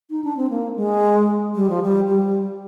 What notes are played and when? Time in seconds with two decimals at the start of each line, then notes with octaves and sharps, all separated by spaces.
0.10 D#4
0.24 D4
0.37 C4
0.50 A#3
0.76 G#3
1.55 G3
1.70 F3
1.83 G3
2.08 G3